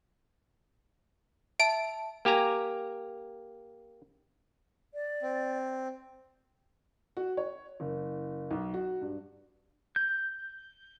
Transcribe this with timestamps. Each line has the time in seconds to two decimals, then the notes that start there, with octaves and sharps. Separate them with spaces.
1.60 E5 A5 D7
2.25 A#3 G4 G#5 A#5
4.94 D5
5.22 C4
7.17 F#4
7.37 C#5
7.80 F#1
8.51 B1
8.74 F#4
9.01 G2
9.96 G6